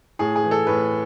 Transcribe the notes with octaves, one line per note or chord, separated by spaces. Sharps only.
A2 G#4
G#4
E3
A4
A2 B4